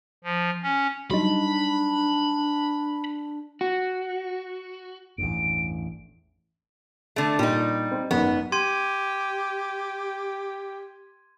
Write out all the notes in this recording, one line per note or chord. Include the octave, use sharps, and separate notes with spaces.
F3
C#4
F#3 G3 D4 D#4 B5
F#4
A1 E2 G2 D7
D3 A3
A#2 G3 D#4
C4
G#1 F#2 D#3 B3
G4 C6 G#6 D#7